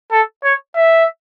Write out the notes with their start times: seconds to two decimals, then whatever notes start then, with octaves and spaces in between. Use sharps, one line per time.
0.12 A4
0.44 C#5
0.76 E5